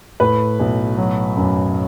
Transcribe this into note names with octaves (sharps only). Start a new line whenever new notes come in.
A2 B4
B1
F#3
F#2